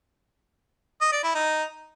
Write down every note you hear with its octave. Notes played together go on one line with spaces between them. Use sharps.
D#5
D5
E4
D#4